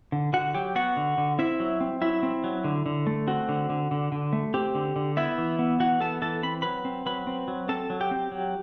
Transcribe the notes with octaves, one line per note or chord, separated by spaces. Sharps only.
D3
D3 F#4 F#5
F#3 G4 G5
B3 F#4 F#5
D3
D3
C4 E4 E5
F#3
C4
F#3 E4 E5
C4
F#3
D3
D3
A3
C4 F#4
D3
D3
D3
D3
A3
C4 G4
D3
D3
B3 E4 E5
E3
B3
E3 F#4 F#5
B3 A4 A5
E3 A4 A5
C4 B5
F#3 B4 B5
C4
F#3 B4 B5
C4
F#3
C4 A4 A5
F#3
G4 G5
C4
F#3